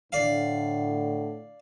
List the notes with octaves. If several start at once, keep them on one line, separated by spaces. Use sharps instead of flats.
A2 D3 D5 F5